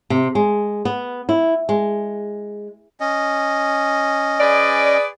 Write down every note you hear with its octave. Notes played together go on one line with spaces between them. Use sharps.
C3
G#3
B3
E4
G#3
C#4 D#5
G#4 B4 D5